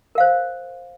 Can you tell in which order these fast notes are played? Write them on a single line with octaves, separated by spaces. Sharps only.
A#4 F5 C5